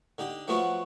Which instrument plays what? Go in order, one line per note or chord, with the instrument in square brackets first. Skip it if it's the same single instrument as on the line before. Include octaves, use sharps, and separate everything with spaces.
[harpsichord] D3 D#4 G4
F3 F#3 A3 B3 F4 F#4